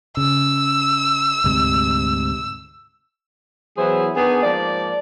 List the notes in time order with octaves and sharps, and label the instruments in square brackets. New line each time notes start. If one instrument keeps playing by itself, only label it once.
[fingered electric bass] C#3 [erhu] E6
[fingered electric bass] D2 G#2 C3
[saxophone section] E3 F#3 B3 E4 G#4 C5
D#3 B3 D4 G#4
G#2 F3 A#3 D5